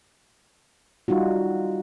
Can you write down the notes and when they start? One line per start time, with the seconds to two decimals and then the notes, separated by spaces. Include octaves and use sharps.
1.08 G3 D#4 F4 F#4